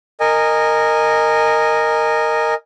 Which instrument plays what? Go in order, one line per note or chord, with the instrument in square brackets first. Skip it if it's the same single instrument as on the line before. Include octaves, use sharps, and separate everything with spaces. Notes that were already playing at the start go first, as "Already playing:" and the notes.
[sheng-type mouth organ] A#4 D#5 G#5